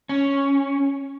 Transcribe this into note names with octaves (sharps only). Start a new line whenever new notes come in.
C#4